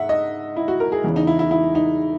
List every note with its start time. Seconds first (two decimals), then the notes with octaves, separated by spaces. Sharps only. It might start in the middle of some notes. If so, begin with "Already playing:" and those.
Already playing: G#2 E5 F#5
0.09 D#5
0.56 E4
0.68 F#4
0.80 A#4
0.92 G#4
1.04 E2 C#3 E3
1.16 D#4
1.27 E4
1.39 E4
1.51 E4
1.75 D#4